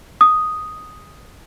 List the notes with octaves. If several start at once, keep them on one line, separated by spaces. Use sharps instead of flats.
D#6